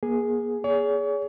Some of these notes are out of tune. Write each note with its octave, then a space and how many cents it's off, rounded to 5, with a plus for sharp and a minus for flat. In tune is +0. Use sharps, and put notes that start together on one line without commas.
A#3 +40 G#4 +0
G#4 +0 C#5 +40